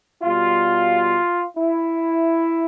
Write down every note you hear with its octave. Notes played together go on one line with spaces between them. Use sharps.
B2 G3 F4
E4